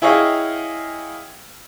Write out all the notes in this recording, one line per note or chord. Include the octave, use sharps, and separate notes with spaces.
E4 G#4 C#5 D#5 F5 G5